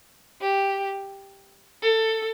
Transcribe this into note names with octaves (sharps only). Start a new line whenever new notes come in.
G4
A4